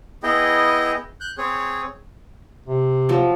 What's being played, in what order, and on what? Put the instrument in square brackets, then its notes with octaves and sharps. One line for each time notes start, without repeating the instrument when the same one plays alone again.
[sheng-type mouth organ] B3 E4 G#4 D#5 G5
F#6 G6
C4 G#4 C#5
[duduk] C3
[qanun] F3 F#3